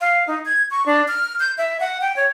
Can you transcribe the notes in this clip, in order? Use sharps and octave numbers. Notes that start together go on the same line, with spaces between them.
F5
D#4
G#6
C#6
D4
F6
G6
E5
F#5
G5
C#5